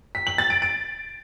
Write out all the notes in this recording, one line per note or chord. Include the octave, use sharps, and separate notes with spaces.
B6
F#7
A6
D7
D7